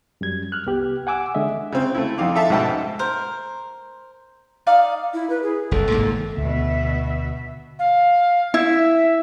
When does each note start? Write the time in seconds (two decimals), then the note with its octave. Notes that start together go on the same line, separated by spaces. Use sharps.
0.21 F#2 G3 G#6
0.52 F6 F#6
0.66 C2 B3 G4
1.07 F#5 G#5 D6 E6
1.35 D3 G#3 D#5 E5
1.72 C#3 C4
1.94 A3 E4
2.18 F2 D#4 F5 D6
2.35 A4 E5 F5 A5
2.50 G#2 B2 D#5 F#5 G5 A5
2.99 A#4 C5
4.67 D#4 D5 F5
5.14 E4
5.30 B4
5.43 G#4
5.71 F#1 C2 A4
5.90 G#1 G#2 A#3
6.37 D2 B2 E5
7.79 F5
8.54 E4 E5